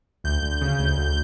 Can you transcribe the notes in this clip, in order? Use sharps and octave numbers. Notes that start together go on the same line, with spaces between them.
D2 G6
D2
C#3
D2
D2